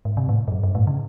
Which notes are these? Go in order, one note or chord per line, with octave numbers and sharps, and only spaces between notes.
G#2
C3
A2
G2
F#2
G2
A2
C#3